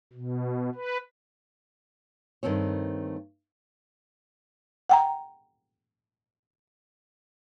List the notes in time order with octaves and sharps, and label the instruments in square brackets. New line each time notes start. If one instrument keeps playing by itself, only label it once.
[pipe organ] B2
B4
[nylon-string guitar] G2 D#3 A3 C4 C#5
[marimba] F#5 G5 A#5